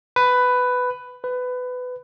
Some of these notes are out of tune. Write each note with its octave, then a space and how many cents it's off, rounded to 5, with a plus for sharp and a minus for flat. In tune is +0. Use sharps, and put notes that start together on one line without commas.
B4 +10
B4 +20